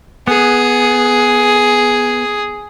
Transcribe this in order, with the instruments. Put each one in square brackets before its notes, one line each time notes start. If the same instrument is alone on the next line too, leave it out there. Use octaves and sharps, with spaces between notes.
[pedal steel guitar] B3 [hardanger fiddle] G#4